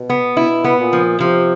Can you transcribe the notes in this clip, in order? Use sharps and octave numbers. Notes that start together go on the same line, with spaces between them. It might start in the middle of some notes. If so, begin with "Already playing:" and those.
Already playing: B2
B3
B2 E4
B3
A#2
F3
C3 F3